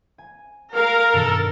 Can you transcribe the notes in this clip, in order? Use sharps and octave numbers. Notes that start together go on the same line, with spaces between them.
G#5
A#4 F5
G2 B2 D#3 A4